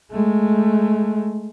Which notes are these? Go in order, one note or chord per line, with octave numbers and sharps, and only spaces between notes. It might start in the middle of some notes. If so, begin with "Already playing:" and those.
G#3 A3